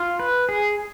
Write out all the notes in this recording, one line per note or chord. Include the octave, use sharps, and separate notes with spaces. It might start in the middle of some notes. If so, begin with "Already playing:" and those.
Already playing: F4
B4
G#4